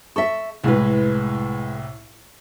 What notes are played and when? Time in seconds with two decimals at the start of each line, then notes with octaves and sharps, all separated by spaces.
0.16 A4 E5 C#6
0.64 C2 A2 G#3 B4